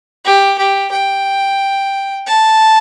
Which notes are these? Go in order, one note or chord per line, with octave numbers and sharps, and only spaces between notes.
G4
G4
G5
A5